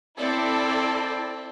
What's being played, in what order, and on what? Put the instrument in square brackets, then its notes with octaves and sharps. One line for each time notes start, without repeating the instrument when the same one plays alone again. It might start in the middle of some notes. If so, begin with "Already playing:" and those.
[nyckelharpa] C4 [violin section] E4 A4 D5